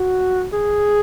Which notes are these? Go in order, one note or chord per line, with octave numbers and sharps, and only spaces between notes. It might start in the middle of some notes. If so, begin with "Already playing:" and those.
Already playing: F#4
G#4